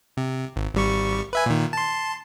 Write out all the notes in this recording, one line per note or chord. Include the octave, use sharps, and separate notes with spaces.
C3
G#1
G#1 G3 C#6
B4 E5 G#5
A#2 D#3
A5 C6